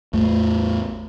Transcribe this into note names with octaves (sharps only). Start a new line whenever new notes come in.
A1 E2 A3